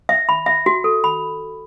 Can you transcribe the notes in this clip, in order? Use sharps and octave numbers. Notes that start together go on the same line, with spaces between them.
E5
B5
E5
F#4
A4
B5